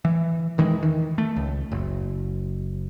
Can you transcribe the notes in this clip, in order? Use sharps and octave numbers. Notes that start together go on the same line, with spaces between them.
E3
E1 D#3 E3 G#3
D#3 E3
A3
C#2
F#1